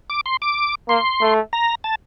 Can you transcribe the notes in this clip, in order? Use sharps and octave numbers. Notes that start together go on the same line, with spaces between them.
D6
C6
D6
A#3 C6
A3
A#5
A5